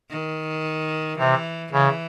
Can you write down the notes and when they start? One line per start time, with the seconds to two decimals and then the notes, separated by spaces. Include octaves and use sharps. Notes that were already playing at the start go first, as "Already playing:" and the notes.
0.10 D#3
1.18 C3 E3
1.72 C#3 E3